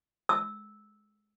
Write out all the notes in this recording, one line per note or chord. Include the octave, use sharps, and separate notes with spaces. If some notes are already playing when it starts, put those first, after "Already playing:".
E6